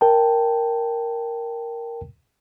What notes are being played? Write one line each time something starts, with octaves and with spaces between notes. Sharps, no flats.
A#4 G5 A5